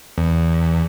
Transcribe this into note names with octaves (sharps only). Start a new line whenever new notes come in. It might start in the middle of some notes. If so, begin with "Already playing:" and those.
E2